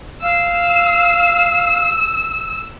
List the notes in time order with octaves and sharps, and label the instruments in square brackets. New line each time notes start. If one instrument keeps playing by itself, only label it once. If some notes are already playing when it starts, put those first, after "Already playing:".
[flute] F5 [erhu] E6